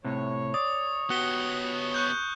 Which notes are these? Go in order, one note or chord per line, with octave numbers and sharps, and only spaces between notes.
A2 C3 C#5
D5 D#6
B3 F#4 G4 C#7 G7
C#6 F#6 G6